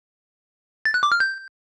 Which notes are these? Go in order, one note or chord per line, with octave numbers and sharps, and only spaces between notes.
A6
F#6
D6
F6
G6